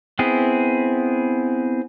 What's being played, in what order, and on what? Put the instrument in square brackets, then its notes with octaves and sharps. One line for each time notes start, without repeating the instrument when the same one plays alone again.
[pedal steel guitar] B3 C4 E4 G#4